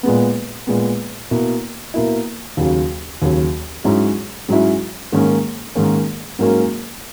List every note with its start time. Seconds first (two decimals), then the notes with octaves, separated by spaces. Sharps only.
0.03 A#2 G#3 B3
0.67 A#2 G#3 B3
1.31 B2 A#3 E4
1.94 B2 A#3 E4
2.57 D#2 C#3 F#3
3.22 D#2 C#3 F#3
3.84 G#2 F#3 C#4 E4
4.48 G#2 F#3 C#4 E4
5.12 G#2 D#3 A#3 C#4
5.75 G#2 D#3 A#3 C#4
6.39 G#2 F#3 A#3 C#4